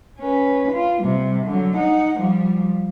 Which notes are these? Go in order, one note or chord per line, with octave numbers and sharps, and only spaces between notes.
C#4 B4
F4
C3 G3
D3 F#3
D#4 F#5
F3 G3